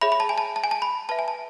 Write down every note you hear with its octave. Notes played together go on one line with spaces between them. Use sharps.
G#4 C#5 E5 B5
B5
A5
G#5
A5
A5
G#5
A5
B5
B4 E5 A5
G#5
A5